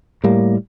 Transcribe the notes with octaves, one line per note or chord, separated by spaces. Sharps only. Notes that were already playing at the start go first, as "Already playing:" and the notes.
A2 G3 A#3